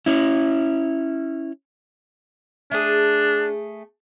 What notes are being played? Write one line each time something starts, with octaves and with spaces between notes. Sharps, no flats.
C#4 E4
A3 D4 G#4